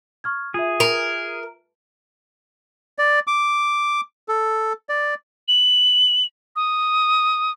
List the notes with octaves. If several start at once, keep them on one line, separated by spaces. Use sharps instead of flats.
C#6 F6 G#6
F4 G#4 E5
A#4
D5
D6
A4
D5
F#7
D#6